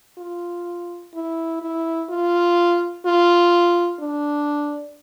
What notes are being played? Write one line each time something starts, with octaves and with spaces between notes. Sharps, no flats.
F4
E4
E4
F4
F4
D4